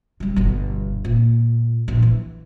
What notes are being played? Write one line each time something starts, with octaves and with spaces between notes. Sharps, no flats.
C3 G3
G1 B2
A#2
A#1
E3